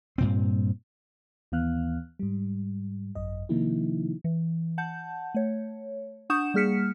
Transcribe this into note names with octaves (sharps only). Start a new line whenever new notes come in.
G2 A#2 C4
D#2 E3 B3 F5 F6 F#6
G#2 G3
G#1 F#2 D#5
C3 D#3 F3 A#3 D#4 E4
E3
F#5 A5 G6
A3 C#5
D4 F#5 C#6 D#6 G6 E7
G3 A#3 G#4 F6 B6 C#7